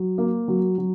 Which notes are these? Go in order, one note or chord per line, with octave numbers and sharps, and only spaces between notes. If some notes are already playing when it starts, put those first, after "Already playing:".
Already playing: F#3
A#3
F#3
F#3